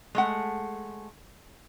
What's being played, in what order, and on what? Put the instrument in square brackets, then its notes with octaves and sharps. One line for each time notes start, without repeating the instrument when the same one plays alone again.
[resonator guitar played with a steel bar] G#3 A3 F#5